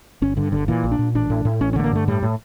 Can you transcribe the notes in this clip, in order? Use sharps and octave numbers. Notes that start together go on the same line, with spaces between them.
G1 C#4
G2 D3
G1 D3
A#2 E3
A#1
D4
A#2
A1 D4
A2
A2
A1 C#4
C#4
D3 A3
A#3
G2 A3
A2 G3
A2